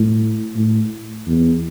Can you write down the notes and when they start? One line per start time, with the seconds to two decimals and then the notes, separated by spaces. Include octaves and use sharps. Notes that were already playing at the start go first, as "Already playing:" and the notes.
Already playing: A2
0.56 A2
1.27 E2